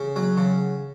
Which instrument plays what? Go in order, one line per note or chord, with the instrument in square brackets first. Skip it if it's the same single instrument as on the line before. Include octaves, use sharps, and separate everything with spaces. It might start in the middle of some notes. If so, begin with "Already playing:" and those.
Already playing: [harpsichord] C#3
F#3
C#3